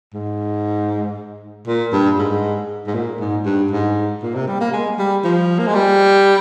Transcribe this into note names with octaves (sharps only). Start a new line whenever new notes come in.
G#2
A#2
G2
G#2
G#2
A#2
G#2
G2
G#2
A#2
C3
G3
A#3
G#3
G3
F3
A#3
G#3
G3